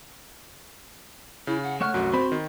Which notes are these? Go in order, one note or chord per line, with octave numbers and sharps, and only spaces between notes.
C#3 E4
F#5
A3 C#5 F#5 F6
C2 F#2 F#4
C4 C5 B5
D#3